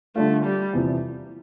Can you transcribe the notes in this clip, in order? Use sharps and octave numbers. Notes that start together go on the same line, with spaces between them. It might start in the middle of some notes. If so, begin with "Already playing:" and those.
D3 G3 A3 D4 F4
G3
E2 C3 F3